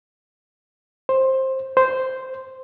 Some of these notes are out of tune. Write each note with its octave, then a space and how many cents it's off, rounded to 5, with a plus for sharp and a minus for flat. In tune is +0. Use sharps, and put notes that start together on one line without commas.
C5 +15
C5 -5